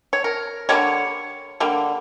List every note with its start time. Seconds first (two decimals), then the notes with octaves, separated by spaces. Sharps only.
0.13 C#5
0.24 A#4
0.69 D3 G3 A#3 C#5
1.60 D3 G3 A#3